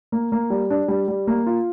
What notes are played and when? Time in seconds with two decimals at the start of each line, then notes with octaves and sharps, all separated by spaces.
0.12 A#3
0.32 A#3
0.50 G3
0.70 D4
0.88 G3
1.08 G3
1.27 A#3
1.46 F4